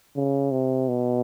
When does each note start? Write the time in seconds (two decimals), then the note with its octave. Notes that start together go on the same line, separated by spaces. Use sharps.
0.16 C#3
0.51 C3
0.88 B2